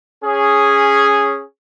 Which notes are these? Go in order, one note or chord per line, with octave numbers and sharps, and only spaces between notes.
C#4 G#4